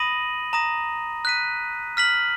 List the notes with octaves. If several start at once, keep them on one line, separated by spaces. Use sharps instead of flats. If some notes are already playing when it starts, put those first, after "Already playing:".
Already playing: B5 D#6 A#6 D#7 F#7
A#5 D#6 A#6
F#6 B6 D#7
F6 B6 F#7